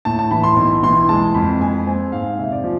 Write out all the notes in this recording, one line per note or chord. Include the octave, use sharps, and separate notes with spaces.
A2 A5
A5
E3 B5
C6
B1
E3 C6
G#3 A5
F2 B5
G#3 G#5
C4 G#5
G#2 F5
C3 E5
D5
F3